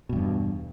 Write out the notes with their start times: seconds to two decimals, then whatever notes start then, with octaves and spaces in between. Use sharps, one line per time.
0.09 B2
0.13 G2
0.16 E2